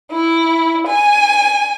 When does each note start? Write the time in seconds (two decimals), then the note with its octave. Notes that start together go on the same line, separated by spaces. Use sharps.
0.11 E4
0.86 G#5